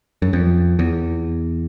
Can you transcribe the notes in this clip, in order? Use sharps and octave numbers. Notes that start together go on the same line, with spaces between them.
F#2
F2
E2